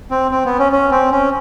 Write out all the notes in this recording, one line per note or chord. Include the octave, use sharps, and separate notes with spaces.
C4
C4
B3
C#4
C#4
C4
C#4